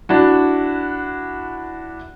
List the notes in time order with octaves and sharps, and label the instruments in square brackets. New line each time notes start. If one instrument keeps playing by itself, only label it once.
[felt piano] D4 E4 F#4